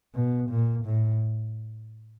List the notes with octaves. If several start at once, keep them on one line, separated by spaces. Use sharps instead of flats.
B2
A#2
A2